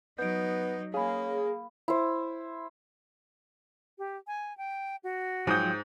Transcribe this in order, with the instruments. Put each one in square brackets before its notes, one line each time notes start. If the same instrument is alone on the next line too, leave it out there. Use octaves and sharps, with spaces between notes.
[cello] F#3 D#4 [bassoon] B3 [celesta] G6 D7
[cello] A#3 [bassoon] C#4 [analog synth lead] G#4 [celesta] F5 B5
[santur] E4 C5
[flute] G4
G#5
G5
F#4
[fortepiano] G#2 D#6 [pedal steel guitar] F3 F#3 G5